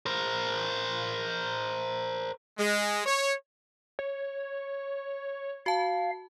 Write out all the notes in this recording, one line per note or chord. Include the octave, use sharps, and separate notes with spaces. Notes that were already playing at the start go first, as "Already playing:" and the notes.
A#4 C5
G#3
C#5
C#5
F#4 F5 A5